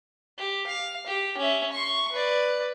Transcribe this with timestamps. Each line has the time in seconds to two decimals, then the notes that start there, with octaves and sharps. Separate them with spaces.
0.38 G4
0.67 F5
1.07 G4
1.37 C#4 E5
1.72 C6 C#6
2.12 B4 D5